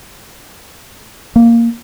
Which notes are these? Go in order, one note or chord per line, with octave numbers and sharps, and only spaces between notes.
A#3